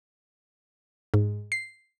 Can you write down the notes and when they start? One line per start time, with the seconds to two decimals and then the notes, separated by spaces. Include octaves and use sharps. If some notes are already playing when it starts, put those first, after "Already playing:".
1.14 G#2
1.52 C7